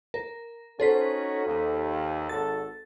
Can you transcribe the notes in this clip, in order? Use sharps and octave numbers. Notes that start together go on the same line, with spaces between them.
A#4
C#4 D#4 F#4 A4 C5 B6
D#2
G#1 F#4 A4 A6